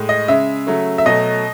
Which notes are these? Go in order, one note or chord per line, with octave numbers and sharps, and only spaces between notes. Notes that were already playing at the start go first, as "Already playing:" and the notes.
Already playing: A2 G#3
D#5
C#3 G#3 E5
C#3 F#3 A3
E5
B2 F#3 A3 D#5